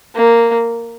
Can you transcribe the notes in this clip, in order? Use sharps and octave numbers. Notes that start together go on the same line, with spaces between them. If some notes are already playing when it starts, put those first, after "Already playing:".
A#3